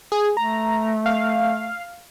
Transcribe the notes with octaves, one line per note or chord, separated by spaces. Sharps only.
G#4
A3 A#5
F5